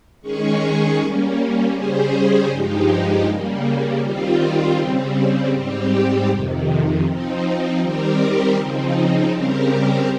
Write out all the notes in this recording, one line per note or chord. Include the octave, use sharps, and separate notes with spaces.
D#3 G#3 C#4 G#4 C#5
G3 A#3 C#4
C#3 G3 C#4 G#4 C5
G2 F3 G#3 D#4 G4
C#3 G3 A#3
D#3 G3 C4 F4
C#3 G3 C4
G#2 G3 C4 G4
F2 C3 D#3
F3 C4 D#4
D#3 G3 C4 G4 A#4
C#3 F3 C4 D#4
C#3 G3 C4 G4 A#4